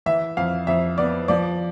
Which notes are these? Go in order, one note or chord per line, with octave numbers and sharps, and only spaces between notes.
E3 E5
F2 F5
F2 E5
B3 D5
F3 D5